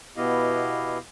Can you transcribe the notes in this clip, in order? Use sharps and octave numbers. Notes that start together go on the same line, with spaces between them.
B2 B3 E4 G4 D#5 F5